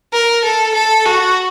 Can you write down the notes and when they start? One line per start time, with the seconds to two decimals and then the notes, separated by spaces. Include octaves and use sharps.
0.14 A#4
0.45 A4
0.75 A4
1.05 F#4